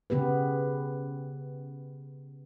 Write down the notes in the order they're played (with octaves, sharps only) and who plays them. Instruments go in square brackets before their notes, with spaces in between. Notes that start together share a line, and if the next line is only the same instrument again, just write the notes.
[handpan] C#3 B3 G4 B4